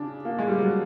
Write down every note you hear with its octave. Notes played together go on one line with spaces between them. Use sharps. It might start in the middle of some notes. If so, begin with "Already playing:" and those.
Already playing: C#3 D4
A#3
G#3
G3
F#3